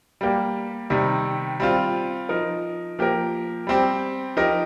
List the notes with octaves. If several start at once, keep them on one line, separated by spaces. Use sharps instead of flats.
G3 A#3 G4
C3 D#3 G3
G3 C4 F4
F3 D#4 A#4
F3 A#3 G4 A#4
G3 C4 G4
F3 D#4 G4 A#4